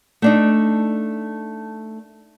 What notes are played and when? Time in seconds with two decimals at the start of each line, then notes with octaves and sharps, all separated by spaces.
0.22 A3 D4 D#4